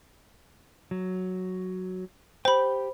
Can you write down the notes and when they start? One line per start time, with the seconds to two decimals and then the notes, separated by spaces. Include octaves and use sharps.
0.91 F#3
2.45 G4 C5 G5 B5